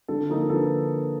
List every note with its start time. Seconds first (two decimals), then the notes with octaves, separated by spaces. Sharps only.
0.08 D3 A4
0.29 F3 A#3 D#4
0.50 D3 A4 B4